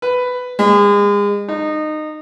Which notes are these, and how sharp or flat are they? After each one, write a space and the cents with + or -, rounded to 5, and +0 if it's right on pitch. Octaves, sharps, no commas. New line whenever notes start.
B4 +10
G#3 -35
D#4 -20